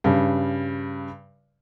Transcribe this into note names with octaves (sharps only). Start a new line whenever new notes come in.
G2 C#3